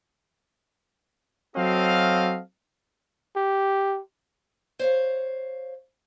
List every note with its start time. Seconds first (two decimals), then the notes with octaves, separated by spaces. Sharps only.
1.56 F#3 C4 F#4 A4 D#5 F5
3.36 G4
4.79 C5 C#5 F5